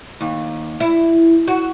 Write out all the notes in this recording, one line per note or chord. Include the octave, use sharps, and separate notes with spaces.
D#2
E4
F#4